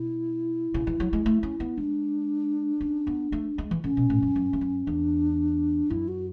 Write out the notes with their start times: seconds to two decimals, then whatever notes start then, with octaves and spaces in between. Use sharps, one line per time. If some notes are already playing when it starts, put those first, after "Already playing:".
Already playing: B2 E4
0.74 C#3
0.87 E3
1.00 F#3
1.13 G#3
1.26 A3
1.43 C#4
1.60 B3
1.77 G#3 D4
2.81 C#4
3.07 B3
3.32 A3
3.58 G#3
3.71 E3
3.84 D3 C#4
3.97 B2
4.10 A2
4.22 F#2
4.36 F#2
4.53 E2
4.61 F#2
4.87 E2 D4
5.90 F#2 E4
6.08 F#4